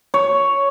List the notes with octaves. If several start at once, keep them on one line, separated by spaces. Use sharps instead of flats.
C#5